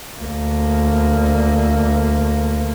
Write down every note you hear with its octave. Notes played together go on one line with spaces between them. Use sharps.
D2 A#3